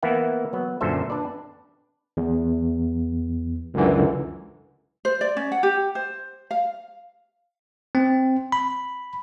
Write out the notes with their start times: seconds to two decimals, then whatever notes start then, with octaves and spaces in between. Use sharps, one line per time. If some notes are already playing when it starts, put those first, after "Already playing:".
0.03 E3 A#3 B3 E4 E5 F#5
0.53 F#3 B3
0.81 F#2 A#2 D3 A4 C5 E5
1.10 D4 B4 D5
2.17 E2
3.74 C#2 F#2 D3 E3
5.05 C5
5.21 D5
5.37 C#4
5.52 F#5
5.63 G4
5.95 C5
6.51 F5
7.95 C4
8.52 B5